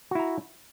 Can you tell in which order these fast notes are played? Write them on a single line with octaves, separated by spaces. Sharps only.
F#4 E4 A#5